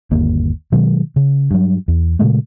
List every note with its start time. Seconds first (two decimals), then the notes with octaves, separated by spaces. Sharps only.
0.11 G1 D#2 A#3
0.72 B2 D#3 F#3 G#3
1.16 C#3
1.51 G2 F#3
1.88 E2
2.19 A#2 C#3 G#3 A3